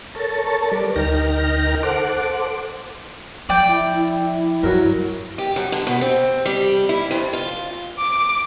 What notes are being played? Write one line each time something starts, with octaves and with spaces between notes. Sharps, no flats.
A4 A#4 C#5 A5
G3 A#4 B4 D5
D2 D#4 A#4 G5 F6 A#6
A4 C5 F#5 D6
F3 D5 G5
E4
G2 F#3 A#4
G4
F#2
D3
B2
C4
G3
E4
F2
F4
D6